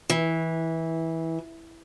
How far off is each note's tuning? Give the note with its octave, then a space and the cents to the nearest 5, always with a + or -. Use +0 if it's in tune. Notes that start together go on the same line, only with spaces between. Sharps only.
E3 -15